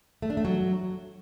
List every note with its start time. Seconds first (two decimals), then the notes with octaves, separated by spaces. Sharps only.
0.22 A3
0.30 D4
0.37 A3
0.45 F#3